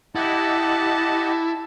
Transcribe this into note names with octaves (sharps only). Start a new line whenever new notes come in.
E4 G4 D#5 F#5 A5